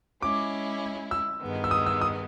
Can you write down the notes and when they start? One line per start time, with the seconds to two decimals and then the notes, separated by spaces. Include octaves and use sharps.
0.22 G#3 C#4 E4 D6
1.11 E6
1.42 G2 D#3 G#3 B3
1.64 E6
1.71 D#6
1.86 E6
2.01 D#6